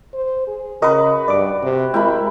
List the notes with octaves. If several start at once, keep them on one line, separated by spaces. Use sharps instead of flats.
C5
G#4
C#3 F#4 A#4 B4 D#5
G2 D5 D6
C3
G#3 E4 A#4 G5 B5